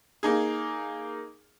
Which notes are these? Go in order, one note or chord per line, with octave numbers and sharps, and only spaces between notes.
A#3 D#4 G#4